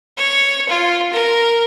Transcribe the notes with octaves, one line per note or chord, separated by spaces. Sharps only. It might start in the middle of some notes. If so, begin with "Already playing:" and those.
C#5
F4
A#4